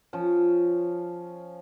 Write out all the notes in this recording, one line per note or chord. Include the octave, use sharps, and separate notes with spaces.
F3 C#4